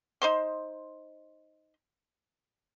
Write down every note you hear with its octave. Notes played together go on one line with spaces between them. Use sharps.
D#4 C5 C6